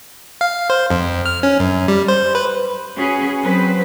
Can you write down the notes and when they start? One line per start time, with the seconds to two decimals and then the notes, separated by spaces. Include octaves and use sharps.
0.41 F5
0.70 C5
0.90 F2
1.26 F6
1.43 C#4
1.60 F#2
1.88 G3
2.08 C5
2.35 B4
2.95 C#4 F#4 G#4 B4
3.41 F#3 C4 B4 C5